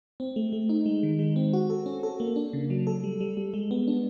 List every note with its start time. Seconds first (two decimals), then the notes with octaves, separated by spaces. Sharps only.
0.20 C4
0.36 A3
0.53 A3
0.69 D#4
0.86 G#3
1.03 D#3
1.19 G#3
1.36 C4
1.53 F#4
1.70 A4
1.86 C#4
2.03 A4
2.20 A#3
2.36 D4
2.53 C#3
2.70 F#3
2.87 A4
3.04 G3
3.21 G3
3.37 G3
3.54 G#3
3.71 B3
3.87 D4